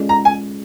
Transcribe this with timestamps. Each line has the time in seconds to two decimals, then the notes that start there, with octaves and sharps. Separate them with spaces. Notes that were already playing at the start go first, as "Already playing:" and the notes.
Already playing: G#3 C#4 F4 A4 D5
0.09 A#5
0.25 G#5